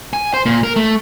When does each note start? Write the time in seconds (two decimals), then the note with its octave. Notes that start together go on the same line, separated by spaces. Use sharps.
0.13 G#5
0.34 C5
0.46 A#2
0.63 A#4
0.76 A3